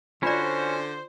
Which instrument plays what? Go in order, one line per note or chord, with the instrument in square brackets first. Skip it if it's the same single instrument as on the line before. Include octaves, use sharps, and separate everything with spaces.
[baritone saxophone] D3 [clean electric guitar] C#4 F#4 [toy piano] F4 D5 [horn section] C5